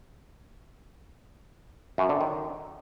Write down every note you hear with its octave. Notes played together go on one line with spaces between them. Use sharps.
F#2
D3
D#3